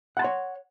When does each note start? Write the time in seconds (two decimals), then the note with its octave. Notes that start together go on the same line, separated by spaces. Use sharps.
0.17 F#5
0.19 A5
0.22 C6
0.24 C#5